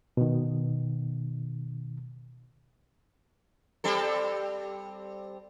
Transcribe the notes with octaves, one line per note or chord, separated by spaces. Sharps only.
B2 D#3
G3 C4 A4